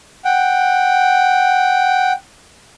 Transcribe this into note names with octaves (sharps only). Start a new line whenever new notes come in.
F#5 G5